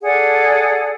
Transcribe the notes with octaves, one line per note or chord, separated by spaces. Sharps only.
G#4 A4 D5 F#5